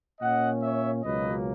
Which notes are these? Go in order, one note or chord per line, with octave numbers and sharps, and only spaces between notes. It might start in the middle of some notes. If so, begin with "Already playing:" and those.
A#2 A#3 C#4 D#5 F#5
C#5 E5
C#2 B2 F#3 A#3 C#4 B4 D#5